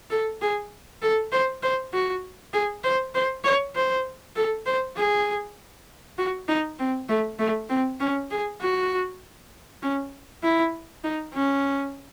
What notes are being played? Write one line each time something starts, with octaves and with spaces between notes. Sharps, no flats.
A4
G#4
A4
C5
C5
F#4
G#4
C5
C5
C#5
C5
A4
C5
G#4
F#4
D#4
C4
A3
A3
C4
C#4
G#4
F#4
C#4
E4
D#4
C#4